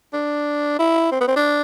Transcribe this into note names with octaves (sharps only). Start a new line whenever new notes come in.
D4
E4
C4
B3
C4
D4